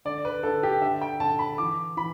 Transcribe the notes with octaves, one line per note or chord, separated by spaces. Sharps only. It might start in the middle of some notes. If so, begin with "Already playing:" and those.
D3 D5
B4
D3 A4
G4
D3 E5
G5
D3 A5
B5
E3 D6
E3 B5